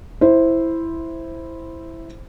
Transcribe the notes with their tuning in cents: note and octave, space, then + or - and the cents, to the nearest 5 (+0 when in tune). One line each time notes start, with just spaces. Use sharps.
E4 +0 C5 +0